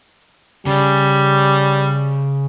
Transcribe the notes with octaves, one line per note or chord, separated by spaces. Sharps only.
C#3 G3